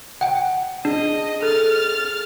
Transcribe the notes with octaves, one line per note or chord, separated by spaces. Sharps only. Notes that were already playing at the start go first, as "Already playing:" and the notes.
F#5 G5
D4 G#4 D#5
A4 F6 A6